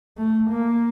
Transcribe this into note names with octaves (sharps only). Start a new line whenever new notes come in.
A3
A#3